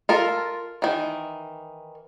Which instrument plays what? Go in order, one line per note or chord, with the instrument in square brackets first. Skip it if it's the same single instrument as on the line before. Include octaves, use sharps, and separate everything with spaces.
[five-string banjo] F4 A4 A#4
D#3 E3